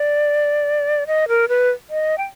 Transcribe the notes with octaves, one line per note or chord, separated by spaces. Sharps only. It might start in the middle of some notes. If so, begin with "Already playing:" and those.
Already playing: D5
D#5
A#4
B4
D#5
G5